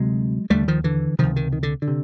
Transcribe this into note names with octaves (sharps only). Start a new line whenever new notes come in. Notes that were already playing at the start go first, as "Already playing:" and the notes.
Already playing: D2 C3 F#3 G#3
D#2 D3 G3 A3
D#3 F3
D3 E3
C#2 C3 D#3 F3
D#3
D#3
D3
D3
C3